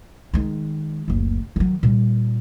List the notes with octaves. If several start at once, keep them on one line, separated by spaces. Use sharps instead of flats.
D#3 G#3
F#1 D2
D#3 F#3
A#2 G3